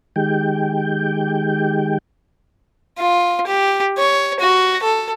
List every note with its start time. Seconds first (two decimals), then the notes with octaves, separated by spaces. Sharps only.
0.16 D#3 G#3 G4 G5
2.98 F4
3.47 G4
3.98 C#5
4.40 F#4
4.83 A4